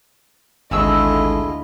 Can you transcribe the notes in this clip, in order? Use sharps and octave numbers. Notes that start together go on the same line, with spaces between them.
G#1 D2 A3 E4 F4 G#4 D#5 E6